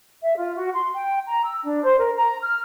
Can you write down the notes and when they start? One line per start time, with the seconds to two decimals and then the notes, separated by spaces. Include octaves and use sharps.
0.23 E5
0.36 F4
0.56 F#4
0.73 C6
0.95 G5
1.25 A#5
1.44 E6
1.63 D4
1.83 C5
1.99 A#4
2.17 A#5
2.41 F6